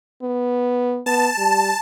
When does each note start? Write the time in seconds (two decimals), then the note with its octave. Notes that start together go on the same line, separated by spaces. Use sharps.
0.22 B3
1.06 B3 A5
1.38 G3